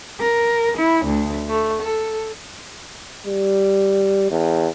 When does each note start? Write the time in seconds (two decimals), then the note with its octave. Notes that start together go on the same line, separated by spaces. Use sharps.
0.20 A#4
0.77 E4
1.07 D2
1.49 A3
1.81 A4
3.27 G3
4.31 E2